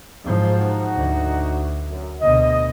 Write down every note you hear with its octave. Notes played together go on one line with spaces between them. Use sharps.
G#2 F3
D#4 F#4
D2
F#2
D2 B2 D#5